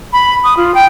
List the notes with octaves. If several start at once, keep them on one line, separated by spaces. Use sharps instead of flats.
B5
D#6
F4
G5